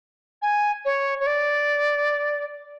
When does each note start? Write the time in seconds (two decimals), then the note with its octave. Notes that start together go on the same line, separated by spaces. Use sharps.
0.42 G#5
0.85 C#5
1.20 C#5
1.27 D5